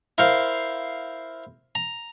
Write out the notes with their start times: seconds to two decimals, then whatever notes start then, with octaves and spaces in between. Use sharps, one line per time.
0.18 E4 A#4 C5 F5 C6
1.75 A#5